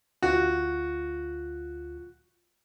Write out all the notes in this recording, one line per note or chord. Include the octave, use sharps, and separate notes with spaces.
D2 F4 F#4